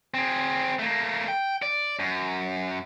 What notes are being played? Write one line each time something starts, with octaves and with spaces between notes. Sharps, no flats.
C4 G#4
A3 A#3
G5
D5
F#2